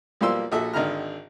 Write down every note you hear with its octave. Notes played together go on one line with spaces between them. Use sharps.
B1 F3 G3 A#3 C6 E6
A#1 A#2 F#4 A4 E5
G#1 D3 D#3 A#5 F6